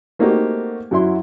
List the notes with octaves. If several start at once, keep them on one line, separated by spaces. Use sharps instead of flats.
A3 A#3 C4 D#4 F#4 G4
F#2 F#3 E4 C6